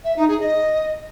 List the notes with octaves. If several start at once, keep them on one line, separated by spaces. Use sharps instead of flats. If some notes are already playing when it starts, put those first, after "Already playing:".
E5
D#4
G#4
D#5